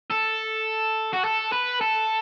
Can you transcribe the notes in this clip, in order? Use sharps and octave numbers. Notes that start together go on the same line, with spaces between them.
A4
F#4
A4
B4
A4